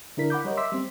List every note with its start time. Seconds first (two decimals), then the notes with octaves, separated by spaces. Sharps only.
0.17 D3 D4 E4 A#4 B6
0.30 F#5 B5 D6 G6
0.45 G3 A#4 C#5 D#5
0.57 E5 C6 D6 E6 B6
0.72 G3 C4